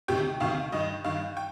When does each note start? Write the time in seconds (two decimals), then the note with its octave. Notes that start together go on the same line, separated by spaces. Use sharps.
0.08 D2 C3 D#3 G4 G5
0.40 D2 C3 D#3 F5
0.72 G2 D#3 D#5
1.04 G2 D#3 F5
1.37 G5